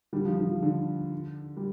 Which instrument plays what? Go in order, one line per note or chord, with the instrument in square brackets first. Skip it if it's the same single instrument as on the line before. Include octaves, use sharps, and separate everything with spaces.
[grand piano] D3 G3
F3
F3
F3
D3
G3